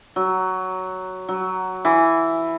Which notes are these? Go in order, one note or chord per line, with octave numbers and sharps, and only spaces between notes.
F#3
F#3
E3